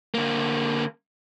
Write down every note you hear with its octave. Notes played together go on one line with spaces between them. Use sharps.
D3 A#3